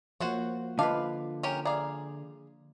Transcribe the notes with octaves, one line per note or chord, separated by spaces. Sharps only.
F3 A#3 F#4 C5 C#5
D3 F4 B4 D#5 F5 A5 D6
C#4 G4 A#4
G#4 D5 F5 A#5 D6